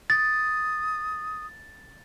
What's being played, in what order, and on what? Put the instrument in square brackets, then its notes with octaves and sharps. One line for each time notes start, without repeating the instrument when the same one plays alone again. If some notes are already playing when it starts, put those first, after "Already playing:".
[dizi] D#6 [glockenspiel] A6